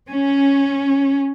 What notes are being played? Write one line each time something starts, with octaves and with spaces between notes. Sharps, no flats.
C#4